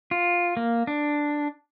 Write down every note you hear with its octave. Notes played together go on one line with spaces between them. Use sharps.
F4
A#3
D4